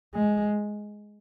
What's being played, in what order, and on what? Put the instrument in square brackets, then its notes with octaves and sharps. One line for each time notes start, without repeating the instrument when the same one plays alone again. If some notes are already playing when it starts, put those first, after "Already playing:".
[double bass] G#3